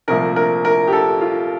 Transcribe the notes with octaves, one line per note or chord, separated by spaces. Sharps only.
C2 A#2 F3 A3 A#4
A#4
A#4
G4
A4
F4